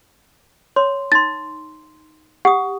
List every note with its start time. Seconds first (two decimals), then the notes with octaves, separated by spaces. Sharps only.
0.76 C#5 C6
1.12 D#4 C6 A6
2.45 G4 F#5 D#6